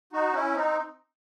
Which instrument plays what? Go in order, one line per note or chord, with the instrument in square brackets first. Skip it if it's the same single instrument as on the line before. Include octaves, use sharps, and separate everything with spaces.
[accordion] D#4 F#4
C#4 E4
C4 D#4